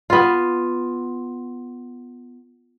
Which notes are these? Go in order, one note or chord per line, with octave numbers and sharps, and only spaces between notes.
B3 F4